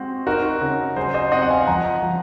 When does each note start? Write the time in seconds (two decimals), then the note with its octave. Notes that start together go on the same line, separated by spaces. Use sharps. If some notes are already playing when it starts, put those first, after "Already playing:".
Already playing: G#3 C4 F#4
0.27 D#4 F#4 A#4
0.61 C#3
0.96 F#3 G#4 C5
1.14 C5 D#5
1.32 C4 D#5 F#5
1.42 F#5
1.50 F5 G#5
1.67 F3 F#5 A#5
2.03 F3